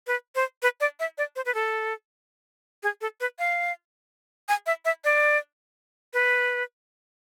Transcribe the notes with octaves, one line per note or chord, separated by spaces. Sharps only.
B4
C5
B4
D5
E5
D5
C5
B4
A4
G#4
A4
B4
F5
G#5
E5
E5
D5
B4